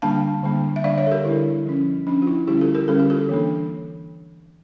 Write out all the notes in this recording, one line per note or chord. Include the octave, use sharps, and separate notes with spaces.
D3 G3 A#3 D4 F5 A5
D3 G3 A#3 D4
E5
D3 G3 D4 D5 F5
C#5 E5
A4
G4 A#4
D3 G3 D4 E4
F3 C#4
F3 C#4 D4
F4
E4
D3 G3 C#4 E4 G4
F4 A4
G4 A#4
D3 G3 C#4 A4
G4
F4 A4
E3 A#3 D4